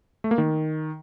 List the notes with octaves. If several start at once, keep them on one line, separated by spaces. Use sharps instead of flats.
A3
A#3
D#3